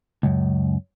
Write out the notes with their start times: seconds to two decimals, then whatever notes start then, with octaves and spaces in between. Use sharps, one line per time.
0.23 C#2 F#2